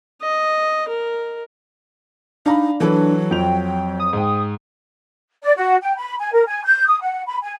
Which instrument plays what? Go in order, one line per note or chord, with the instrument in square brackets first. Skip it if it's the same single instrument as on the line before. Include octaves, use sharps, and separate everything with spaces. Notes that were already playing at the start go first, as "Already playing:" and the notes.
[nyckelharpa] D#5
A#4
[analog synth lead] D4 [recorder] D#4 [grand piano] F5 A#5 B5
[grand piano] E3 A4 B4 [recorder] F#3
[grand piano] F2 F4 F7 [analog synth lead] G5
[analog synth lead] D#6
[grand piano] G#2 G5
[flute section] D5
F#4
G5
B5
G#5
A#4
G#5
G6
D#6
F#5
B5
G#5